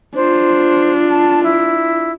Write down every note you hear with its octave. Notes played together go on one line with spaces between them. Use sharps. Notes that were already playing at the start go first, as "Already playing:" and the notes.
D4 F4 C5
A5
E4